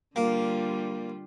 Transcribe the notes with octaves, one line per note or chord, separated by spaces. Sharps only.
D3 G3 A#3 F4